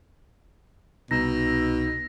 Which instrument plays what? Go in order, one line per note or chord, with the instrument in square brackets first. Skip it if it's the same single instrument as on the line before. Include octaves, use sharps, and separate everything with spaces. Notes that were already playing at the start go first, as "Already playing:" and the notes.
[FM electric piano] C2 E6 [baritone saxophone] B2 [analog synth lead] D#4 [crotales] A#6